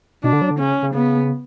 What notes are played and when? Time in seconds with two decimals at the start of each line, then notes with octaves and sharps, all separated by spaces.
0.24 B2 D4
0.33 D3
0.42 F#3
0.51 D3
0.60 C#3 C#4
0.82 C#3
0.94 C#3 B3